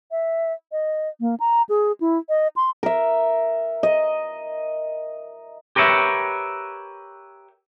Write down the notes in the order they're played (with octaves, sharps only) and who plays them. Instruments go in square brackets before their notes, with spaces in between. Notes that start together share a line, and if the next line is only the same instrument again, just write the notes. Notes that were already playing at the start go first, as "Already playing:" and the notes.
[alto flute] E5
D#5
A#3
A#5
G#4
E4
D#5
C6
[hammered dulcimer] A#4 E5
D#5
[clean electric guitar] G4 A#4 B4 C#5 E5